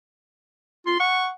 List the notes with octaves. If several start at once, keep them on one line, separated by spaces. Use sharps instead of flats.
F4 C6
F#5 C#6